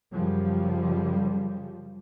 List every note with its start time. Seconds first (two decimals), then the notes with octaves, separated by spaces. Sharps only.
0.13 F#2 C#3 F3 G3